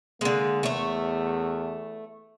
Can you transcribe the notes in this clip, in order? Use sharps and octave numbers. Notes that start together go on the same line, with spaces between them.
D3 G#3 A#3
E2 A3 C#5